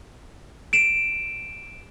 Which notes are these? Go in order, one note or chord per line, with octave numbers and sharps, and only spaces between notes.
D7 E7